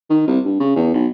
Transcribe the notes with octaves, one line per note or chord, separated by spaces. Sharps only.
D#3
C2
G2
C#3
E2
B1